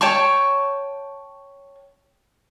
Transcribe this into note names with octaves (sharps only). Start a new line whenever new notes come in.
C#5 G5 A5 C#6